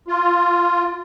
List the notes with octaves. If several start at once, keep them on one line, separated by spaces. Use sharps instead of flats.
F4